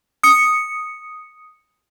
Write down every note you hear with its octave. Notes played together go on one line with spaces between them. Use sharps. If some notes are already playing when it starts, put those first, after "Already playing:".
D#6 C#7